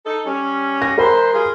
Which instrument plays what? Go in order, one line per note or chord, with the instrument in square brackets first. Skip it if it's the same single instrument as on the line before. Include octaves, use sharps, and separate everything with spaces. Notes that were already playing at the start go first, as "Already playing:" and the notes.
[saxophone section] D#4 A4
G3 C#4
[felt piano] A#6
[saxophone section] E3 G#3 C5 [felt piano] A#4 A#5 B5
[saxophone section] G3 F4 G#4